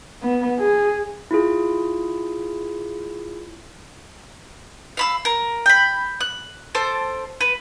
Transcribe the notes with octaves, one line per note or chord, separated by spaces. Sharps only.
B3
G#4
E4 F4 G#4
F5 B5 E6
A#4
G5 B5
F#6
A4 C5 A5 D6
B4